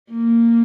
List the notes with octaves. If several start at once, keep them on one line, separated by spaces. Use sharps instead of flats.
A#3